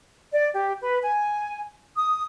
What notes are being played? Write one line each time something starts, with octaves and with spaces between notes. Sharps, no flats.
D5
G4
B4
G#5
D#6